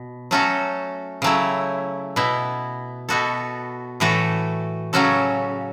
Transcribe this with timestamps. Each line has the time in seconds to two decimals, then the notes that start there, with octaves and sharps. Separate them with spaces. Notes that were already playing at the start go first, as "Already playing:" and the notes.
Already playing: B2
0.31 F#3 A3 C#4 F#4 A4
1.22 C#3 F#3 A3 E4
2.16 B2 B3 E4
3.09 B2 B3 F#4 A4
4.00 A2 E3 A3 F#4 A4
4.93 C#3 F#3 C#4 F#4 A4